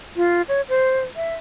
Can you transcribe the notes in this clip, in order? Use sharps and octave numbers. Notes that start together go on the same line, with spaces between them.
F4
C#5
C5
E5